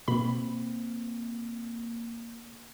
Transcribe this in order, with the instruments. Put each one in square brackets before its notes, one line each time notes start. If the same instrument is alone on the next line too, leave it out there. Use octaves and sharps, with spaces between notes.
[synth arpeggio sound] B2 B5 [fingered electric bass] A#3 C4